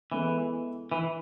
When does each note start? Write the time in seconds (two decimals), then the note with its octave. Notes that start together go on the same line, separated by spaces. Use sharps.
0.11 E3 G#3 B3 E4 A4
0.92 E3